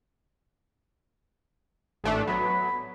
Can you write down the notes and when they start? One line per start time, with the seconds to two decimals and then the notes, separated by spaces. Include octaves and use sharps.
2.04 A1 A3 D4
2.27 F#3 B3 B5